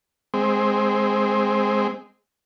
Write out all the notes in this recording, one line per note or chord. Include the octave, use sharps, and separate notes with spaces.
G#3 C4